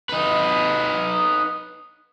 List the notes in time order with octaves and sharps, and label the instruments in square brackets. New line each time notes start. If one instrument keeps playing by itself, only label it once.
[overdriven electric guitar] D#4 B4